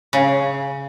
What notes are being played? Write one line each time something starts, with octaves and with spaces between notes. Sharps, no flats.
C#3